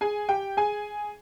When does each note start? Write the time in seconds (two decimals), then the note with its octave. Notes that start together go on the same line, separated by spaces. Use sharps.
0.01 G#4 G#5
0.29 G4 G5
0.57 G#4 G#5